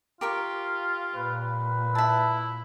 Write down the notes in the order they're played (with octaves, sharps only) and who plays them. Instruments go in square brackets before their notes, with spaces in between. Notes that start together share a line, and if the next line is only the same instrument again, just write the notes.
[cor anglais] F4 [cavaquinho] G4 A#4 C#6
[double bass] A#2 [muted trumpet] B4
[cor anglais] E4 [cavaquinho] E5 A5